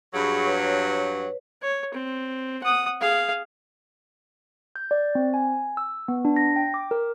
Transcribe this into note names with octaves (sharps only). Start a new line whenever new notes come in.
G2 F#3 G#4 B5 C#6
B4 C#5
C#5
C4
F#5 D#6
G#4 F5
G6
D5
C4
G#5
E6
B3
D4
A#6
G5
D6
A#4